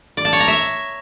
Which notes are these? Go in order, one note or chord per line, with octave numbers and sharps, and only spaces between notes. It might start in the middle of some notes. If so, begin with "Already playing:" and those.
D5
A5
C#5
A#5
E5